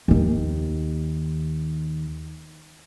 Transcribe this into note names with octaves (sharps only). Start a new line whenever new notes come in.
D#2 D#3